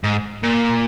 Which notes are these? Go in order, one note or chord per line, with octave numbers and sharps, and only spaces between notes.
G#2
A#2